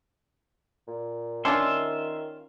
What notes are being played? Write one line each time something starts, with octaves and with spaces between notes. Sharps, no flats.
A#2
D#3 C#4 D4 F4 E5 C6